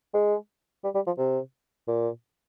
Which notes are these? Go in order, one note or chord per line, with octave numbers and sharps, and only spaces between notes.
G#3
G3
G3
F3
C3
A#2